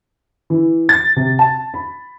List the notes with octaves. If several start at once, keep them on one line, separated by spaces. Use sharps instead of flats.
E3
A6
C3
A5
B5